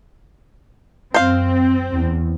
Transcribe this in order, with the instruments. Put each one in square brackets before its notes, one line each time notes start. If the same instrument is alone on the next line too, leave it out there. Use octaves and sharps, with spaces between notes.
[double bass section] F#2 [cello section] C4 [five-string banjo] C5 F5
[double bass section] E2